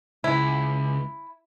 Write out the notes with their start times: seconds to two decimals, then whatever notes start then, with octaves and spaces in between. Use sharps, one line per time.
0.24 C#2 E4